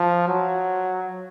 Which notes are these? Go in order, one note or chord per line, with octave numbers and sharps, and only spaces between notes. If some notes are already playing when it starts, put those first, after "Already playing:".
Already playing: F3
F#3